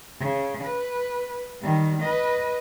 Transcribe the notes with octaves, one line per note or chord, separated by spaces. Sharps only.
C#3
B4
D#3 G3
B4 D#5